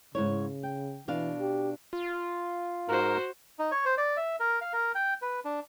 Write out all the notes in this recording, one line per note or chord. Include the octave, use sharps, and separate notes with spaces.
G#2 C#3 E4 C#5
G5
B2 E3 D4 F5
G4
F4
G#2 F#4 A#4 C5
D#4
C#5
C5
D5
E5
A#4
F5
A#4
G5
B4
D4